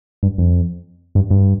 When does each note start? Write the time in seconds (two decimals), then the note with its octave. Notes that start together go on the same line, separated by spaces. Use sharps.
0.23 G2
0.38 F2
1.15 G2
1.30 G2